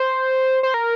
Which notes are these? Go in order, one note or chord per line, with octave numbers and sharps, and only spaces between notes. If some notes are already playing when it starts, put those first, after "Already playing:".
Already playing: C5
C5
A#4